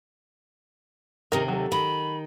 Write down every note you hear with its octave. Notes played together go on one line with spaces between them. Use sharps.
D#2 C3 D#3 D#4 A#4
F#3 A4
D#3 B5